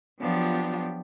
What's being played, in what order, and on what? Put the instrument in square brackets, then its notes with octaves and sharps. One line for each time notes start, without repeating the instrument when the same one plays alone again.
[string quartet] F3 F#3 B3 D4 F4 G4